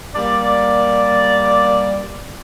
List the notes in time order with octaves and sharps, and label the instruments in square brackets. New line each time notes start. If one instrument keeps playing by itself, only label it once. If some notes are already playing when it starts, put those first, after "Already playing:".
[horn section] G3 A#3 D5